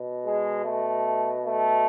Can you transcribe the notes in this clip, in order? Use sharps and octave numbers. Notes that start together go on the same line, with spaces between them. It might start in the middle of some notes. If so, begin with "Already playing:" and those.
Already playing: B2
G#3
A3
A3